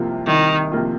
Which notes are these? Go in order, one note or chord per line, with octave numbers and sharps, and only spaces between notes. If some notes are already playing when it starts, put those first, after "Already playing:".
Already playing: C2 C3 F3 A#3 F4
C2 D#3
C3 F3 A#3 F4